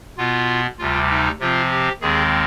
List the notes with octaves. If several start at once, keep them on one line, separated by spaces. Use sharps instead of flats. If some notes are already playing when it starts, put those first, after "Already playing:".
B2 B3 F4
D2 C3 G3 F4
D#4
C3 F3 C4 F4
G4
D#2 D#3 G#3 C4 G#4